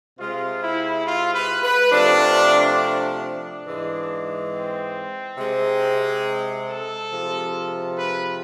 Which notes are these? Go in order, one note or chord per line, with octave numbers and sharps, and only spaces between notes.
C3 G#3 F4
E4
F4
B4
B4
C3 F3 A3 D4
D4
D4
G#2 E3 G#3
C4
C3 G#3
A4
C3 F3 G#3
B4